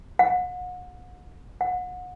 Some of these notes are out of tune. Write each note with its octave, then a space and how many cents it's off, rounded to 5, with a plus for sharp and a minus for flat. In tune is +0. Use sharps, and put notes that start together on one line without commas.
F#5 -35
F#5 -30